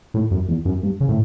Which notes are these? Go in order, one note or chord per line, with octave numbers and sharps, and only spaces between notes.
A2
F#2
E2
F#2
G2
C#3
A2